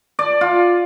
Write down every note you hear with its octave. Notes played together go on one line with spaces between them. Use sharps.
D5
F4